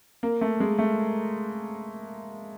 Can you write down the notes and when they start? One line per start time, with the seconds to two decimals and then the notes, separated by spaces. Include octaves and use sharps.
0.23 A#3
0.41 A3
0.60 G#3
0.79 A3